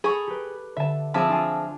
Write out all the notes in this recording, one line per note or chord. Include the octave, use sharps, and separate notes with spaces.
G#4 A4 A#5 B5 C#6
G4 B4
D3 E5 A5
F3 C4 G#4 E5 A5 B5 D6
D4 F4 G#5